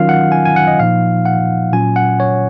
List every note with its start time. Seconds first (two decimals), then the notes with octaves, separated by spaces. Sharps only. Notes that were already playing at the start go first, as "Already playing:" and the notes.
Already playing: D#3 F#3 C#4 F4 F5
0.09 F#5
0.32 G#5
0.45 G#5
0.56 F#5
0.67 D#5
0.79 A#2 F3 A#3 D#4 F5
1.25 F#5
1.72 A#2 F#3 C#4 F4 G#5
1.96 F#5
2.20 C#5